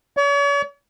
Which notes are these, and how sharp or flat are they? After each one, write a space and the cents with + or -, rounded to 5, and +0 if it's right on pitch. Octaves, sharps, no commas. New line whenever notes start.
C#5 +40